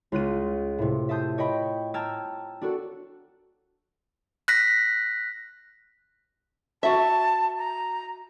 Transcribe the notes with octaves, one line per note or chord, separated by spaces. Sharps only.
C#2 F4 F#6 D#7
A2 C3
E5 A5 C6 D#6 G6
C#5 D#5 G5 B5
G5 A5 A#5 E6 F6 G#6
D4 F#4 A4
F#6 A#6 B6
F#4 E5 A5
A#5